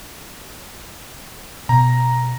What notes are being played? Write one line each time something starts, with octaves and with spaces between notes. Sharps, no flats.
B2 A#5